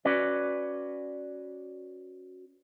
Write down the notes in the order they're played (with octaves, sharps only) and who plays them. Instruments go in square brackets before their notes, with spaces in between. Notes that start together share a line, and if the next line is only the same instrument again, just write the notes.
[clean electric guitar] C#4 F#4 B4 D5